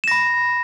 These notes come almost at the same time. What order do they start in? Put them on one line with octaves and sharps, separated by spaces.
E7 A#6 B5